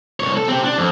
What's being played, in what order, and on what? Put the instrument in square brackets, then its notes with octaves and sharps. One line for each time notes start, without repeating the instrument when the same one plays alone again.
[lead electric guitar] C2 C#5
A4
C4 G4
D4
F2